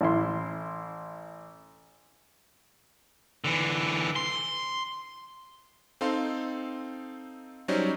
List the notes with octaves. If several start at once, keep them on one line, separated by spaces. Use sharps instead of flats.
A1 E4 C6
D3 E3
C6
C4 D#4 A4 F5 C6
F#3 G3 C#4 D#4 C5 D5